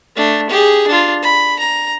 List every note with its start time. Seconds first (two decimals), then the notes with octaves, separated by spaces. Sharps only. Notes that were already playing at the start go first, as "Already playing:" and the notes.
0.16 A3 D4
0.50 G4 G#4
0.88 D4 F4
1.22 B5
1.59 A#5